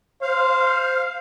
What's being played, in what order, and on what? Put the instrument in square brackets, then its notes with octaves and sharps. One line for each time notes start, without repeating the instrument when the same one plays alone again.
[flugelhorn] C5 [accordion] F5